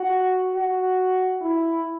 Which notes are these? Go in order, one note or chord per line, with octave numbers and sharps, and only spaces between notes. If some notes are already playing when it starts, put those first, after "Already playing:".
Already playing: F#4
F#4
E4